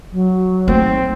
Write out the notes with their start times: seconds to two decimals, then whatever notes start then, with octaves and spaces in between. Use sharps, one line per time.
0.12 F#3
0.68 A3 C4 D#4